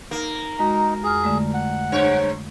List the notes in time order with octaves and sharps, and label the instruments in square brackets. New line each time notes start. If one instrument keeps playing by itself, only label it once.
[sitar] A#3 [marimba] D#4
[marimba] G#3 F#4 [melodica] D#4
[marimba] F2 F6 [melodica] G#4
[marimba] D3 G#3 A3
[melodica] F#5
[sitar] G2 C#5